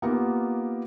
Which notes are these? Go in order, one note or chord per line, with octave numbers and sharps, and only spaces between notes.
A#3 B3 D#4 F4 G4 A#4